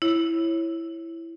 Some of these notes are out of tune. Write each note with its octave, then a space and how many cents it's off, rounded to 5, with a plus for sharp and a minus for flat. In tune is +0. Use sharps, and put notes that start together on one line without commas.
E4 +10 C#5 -15